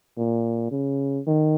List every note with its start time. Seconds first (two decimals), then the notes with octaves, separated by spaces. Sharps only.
0.18 A#2
0.72 C#3
1.27 D#3